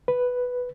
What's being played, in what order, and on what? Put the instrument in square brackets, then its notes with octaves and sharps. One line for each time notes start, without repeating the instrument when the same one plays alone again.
[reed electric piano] B4